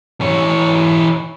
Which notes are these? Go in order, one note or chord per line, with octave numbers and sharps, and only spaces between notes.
E3 C#5